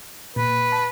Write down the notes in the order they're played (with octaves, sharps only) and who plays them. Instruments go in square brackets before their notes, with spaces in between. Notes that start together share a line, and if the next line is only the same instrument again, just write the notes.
[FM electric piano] A#2 [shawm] B4
[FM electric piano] A5